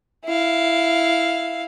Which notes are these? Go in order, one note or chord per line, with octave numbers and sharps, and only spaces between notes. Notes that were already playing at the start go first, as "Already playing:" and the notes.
E4 F5